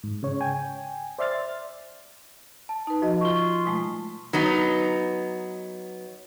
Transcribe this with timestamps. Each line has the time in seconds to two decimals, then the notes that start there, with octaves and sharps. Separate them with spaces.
0.03 G#2
0.23 C#3 C#5
0.41 G5 G#5
1.19 C5 D5 E5 C6 F6 A6
2.69 A5
2.87 D#4 B4 A5
3.02 F3 F#4 D#5
3.21 F4 C#6 G7
3.65 B2 G#3 A3
4.33 F#3 B3 D#4